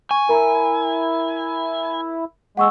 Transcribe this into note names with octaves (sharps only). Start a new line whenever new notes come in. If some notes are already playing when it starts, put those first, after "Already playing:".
G#5 C#6
E4 A#4 A#5
G#3 F#5 C#6 E6